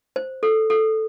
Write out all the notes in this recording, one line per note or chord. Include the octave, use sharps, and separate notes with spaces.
C5
A4
A4